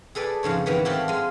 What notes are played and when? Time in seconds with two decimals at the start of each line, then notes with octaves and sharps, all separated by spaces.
0.15 G#4 A4 B4 D5
0.43 F2 G#2 C#3 C#5
0.66 D#3 E3 B3 B4 C#5
0.85 C4 F4 G4 A4 C#5 F#5
1.08 G#3 F4